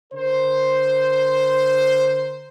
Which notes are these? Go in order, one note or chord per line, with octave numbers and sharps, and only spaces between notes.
D3 A#4 C5